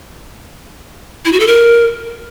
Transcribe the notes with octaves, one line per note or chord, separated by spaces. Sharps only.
E4
F#4
A4
A#4